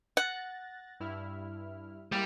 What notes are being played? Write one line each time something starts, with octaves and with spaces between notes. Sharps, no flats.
F#5 F#6 A6 A#6
G2 E4 F6
G3 G#3 A#3 E4